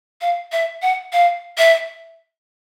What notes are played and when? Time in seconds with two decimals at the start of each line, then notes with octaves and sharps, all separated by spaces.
0.21 F5
0.52 E5
0.82 F#5
1.13 F5
1.58 E5